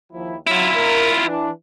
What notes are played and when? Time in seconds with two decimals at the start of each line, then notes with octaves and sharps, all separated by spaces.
0.13 D#2 F3 E4
0.47 F#3 E4 F4
0.76 A#4
1.26 E3 D4